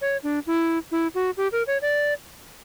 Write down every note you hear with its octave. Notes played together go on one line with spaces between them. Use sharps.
C#5
D4
E4
E4
F#4
G4
A#4
C#5
D5